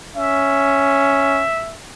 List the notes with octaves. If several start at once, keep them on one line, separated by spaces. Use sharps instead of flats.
C#4 E5